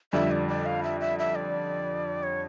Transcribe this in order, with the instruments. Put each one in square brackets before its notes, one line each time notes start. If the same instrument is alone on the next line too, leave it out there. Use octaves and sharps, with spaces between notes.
[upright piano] F2 D3 G3 D4 [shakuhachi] E5
[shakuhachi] D5
D5
F5
E5
E5
E5
D5
C#5